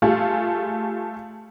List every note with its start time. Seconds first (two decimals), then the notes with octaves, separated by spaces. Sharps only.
0.02 G3 A3 F4 G#4